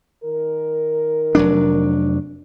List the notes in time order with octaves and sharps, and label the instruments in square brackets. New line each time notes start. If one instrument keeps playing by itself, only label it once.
[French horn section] D#3 A#4
[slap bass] F1 F#3 D4